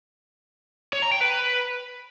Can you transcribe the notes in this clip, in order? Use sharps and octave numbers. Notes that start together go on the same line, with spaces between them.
C#5
A#5
G5
B4